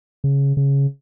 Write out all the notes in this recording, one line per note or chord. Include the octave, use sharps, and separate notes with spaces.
C#3
C#3